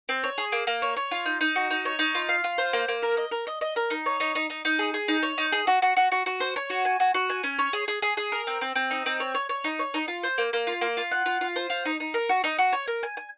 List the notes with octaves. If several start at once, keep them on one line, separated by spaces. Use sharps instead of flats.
C4
C#5
G#4
A#3
A#3
C#5
C#5
F4
D#4
D#4
F#4
D#4
C#5
D#4
F4
F5
F4
C5
A#3
A#3
A#4
D#5
A#4
D#5
D#5
A#4
D#4
C#5
D#4
D#4
D#4
D#4
G#4
G#4
D#4
C#5
D#4
G#4
F#4
F#4
F#4
F#4
F#4
C5
C#5
F#4
G#5
F#4
F#4
G#5
C#4
C#5
G#4
G#4
G#4
G#4
A#4
C4
C4
C4
D#4
C4
C#5
C#5
C#5
D#4
C#5
D#4
F4
C5
A#3
A#3
F4
A#3
F4
F#5
F4
F4
C5
F4
D#4
D#4
A#4
F#4
D#4
F#4
C#5
A#4
G#5
G#5